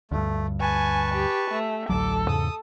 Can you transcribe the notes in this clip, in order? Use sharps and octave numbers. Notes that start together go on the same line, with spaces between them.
D2 G2 A3
B4 G#5 A5 C#6
G4
A3
A1 D2 F#3 A4 D6
E2 G#2 C#3 D#6